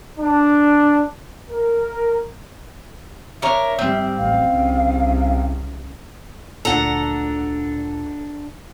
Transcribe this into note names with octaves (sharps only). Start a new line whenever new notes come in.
D4
A#4
D4 A#4 C#5 E5
G#2 G3 C4
A1 F#2 F5
C2 C#3
D2 A#2 D4 A4 F#5 A#5